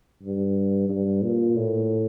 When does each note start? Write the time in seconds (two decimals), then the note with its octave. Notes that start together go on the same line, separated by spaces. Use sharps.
0.23 G2
0.89 G2
1.22 A#2
1.56 A2